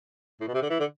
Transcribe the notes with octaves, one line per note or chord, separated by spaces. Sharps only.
A2
B2
C3
D3
E3
D3